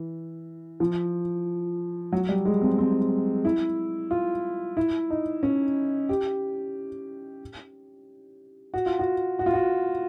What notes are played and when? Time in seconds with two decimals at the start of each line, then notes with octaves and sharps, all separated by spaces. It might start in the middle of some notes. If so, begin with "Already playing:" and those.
Already playing: E3
0.80 F3
2.12 F#3
2.29 G3
2.45 G#3
2.62 C4
2.78 C4
3.45 E4
4.11 F4
4.77 E4
5.10 D#4
5.43 C#4
6.09 G4
8.74 F#4
8.86 F4
8.99 F#4
9.39 F#4
9.46 F4
9.54 F#4